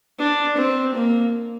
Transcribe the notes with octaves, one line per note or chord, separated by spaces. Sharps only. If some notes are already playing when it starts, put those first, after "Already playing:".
D4
C4
A#3